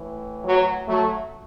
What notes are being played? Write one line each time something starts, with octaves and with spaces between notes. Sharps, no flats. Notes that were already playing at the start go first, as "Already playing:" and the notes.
Already playing: A2 E3
F#3
F#3 A3